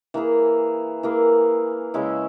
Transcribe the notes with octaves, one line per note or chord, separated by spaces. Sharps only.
E3 A#3 E4 G#4
E3 A#3 E4 G#4
C#3 G#3 C#4 E4